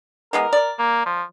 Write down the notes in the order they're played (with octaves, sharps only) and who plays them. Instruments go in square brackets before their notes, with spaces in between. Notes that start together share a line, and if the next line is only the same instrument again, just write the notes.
[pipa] E3 G#3 B3 [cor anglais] A#4
[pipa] D5
[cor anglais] A#3
F3